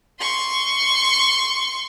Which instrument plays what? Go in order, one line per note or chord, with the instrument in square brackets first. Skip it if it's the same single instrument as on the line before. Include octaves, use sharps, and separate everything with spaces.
[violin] C6 C#6